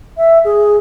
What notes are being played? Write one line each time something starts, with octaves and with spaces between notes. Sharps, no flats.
E5
G#4